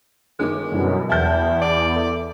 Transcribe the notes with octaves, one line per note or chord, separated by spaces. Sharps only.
G1 D#3 G#3 D6
F#2 B2 D3 E3 G3
E2 E4 G5 A5 G6
D5
A4 E5